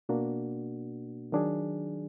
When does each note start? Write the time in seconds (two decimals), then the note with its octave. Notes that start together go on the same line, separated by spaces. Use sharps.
0.09 B2 A#3 D4 F#4
1.32 D#3 F#3 D4 G#4